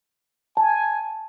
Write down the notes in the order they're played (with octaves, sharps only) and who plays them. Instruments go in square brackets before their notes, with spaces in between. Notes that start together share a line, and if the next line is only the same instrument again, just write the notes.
[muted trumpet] G#5 [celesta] A5